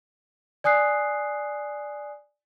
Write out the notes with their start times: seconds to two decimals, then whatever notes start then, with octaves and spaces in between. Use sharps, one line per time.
0.64 D5 G#5 D#6 F#6 C7